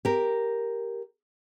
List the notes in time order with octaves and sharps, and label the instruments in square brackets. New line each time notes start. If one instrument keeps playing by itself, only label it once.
[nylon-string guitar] G4 A#4